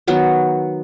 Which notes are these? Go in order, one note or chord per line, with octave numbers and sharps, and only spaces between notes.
D#3 F#3 B3 F#4